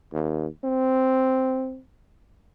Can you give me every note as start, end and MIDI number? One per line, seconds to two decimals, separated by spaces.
0.13 0.47 39
0.64 1.80 60